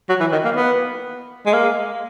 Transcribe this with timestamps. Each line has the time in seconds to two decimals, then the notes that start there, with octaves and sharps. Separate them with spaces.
0.09 F#3
0.20 E3
0.32 D#3
0.45 A#3
0.56 B3
1.46 G#3
1.53 A#3